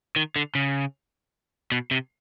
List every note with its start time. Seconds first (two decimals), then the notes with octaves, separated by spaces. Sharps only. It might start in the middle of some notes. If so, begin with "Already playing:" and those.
0.16 D#3
0.36 D3
0.55 C#3
1.72 B2
1.91 C3